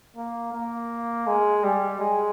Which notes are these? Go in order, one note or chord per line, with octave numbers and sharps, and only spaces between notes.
A#3
A#3
G#3
G3
G#3